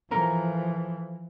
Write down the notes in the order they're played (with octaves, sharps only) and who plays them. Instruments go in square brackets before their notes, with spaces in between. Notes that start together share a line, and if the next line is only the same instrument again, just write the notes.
[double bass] E3 F3 [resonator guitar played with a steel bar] A4 A#4 A#5